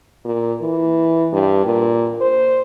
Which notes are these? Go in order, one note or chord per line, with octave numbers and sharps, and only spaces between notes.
A#2
E3
G2
A#2
C5